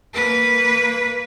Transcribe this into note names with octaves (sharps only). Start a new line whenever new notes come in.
A#3 B4